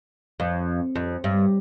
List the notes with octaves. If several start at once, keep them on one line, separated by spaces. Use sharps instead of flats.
F2
F2
G2